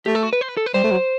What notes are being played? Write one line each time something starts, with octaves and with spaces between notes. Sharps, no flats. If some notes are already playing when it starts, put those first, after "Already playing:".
A3 G4
A4
F#4
B4
C5
B4
A4
B4
G3 C5
A3
F#3